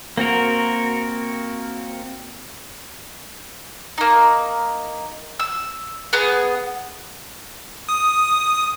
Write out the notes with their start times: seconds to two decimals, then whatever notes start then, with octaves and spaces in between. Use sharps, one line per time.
0.18 A#3 C4 F#4 A#4
3.98 A#3 D#4
5.39 E6
6.13 B3 G#4
7.89 D#6